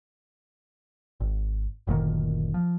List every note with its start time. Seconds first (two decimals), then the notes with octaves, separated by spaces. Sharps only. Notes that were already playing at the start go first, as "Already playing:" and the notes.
1.20 G#1
1.87 F#1 D2 A#2 D#3
2.54 F3